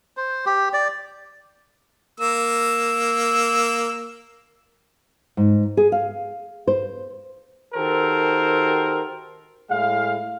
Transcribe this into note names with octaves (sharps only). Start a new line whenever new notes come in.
C5
G4
D5
A#3 E6
G#2
G#4
F5
C5
D#3 F#4 G4 A4 A#4 C5
A2 G#3 E4 F5